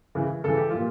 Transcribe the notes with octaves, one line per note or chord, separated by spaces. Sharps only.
C#3 E3
C#3 E3 A4
G4
A#2 F3 F4